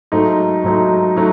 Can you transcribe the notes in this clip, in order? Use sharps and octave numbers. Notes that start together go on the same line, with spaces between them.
G#2 F#3 A3 D#4
G#2 F#3 A3 D#4
F#3 A3 D#4